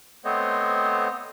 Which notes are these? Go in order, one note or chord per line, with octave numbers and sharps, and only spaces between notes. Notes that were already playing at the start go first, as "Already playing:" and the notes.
A3 B3 C4 C5 C#5 D#5